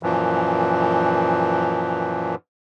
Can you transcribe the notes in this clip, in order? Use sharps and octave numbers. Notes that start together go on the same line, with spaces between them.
F#2 A#2 E3 F3